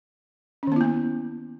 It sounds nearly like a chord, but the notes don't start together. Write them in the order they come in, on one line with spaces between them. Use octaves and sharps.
C#4 D#3 B3 E4 A#3